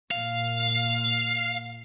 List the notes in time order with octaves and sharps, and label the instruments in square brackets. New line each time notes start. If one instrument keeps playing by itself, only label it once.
[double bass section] A#2 [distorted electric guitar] F5